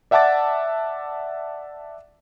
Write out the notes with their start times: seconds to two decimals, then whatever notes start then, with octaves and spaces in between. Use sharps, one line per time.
0.11 D5 E5 F#5 A5 D6 A6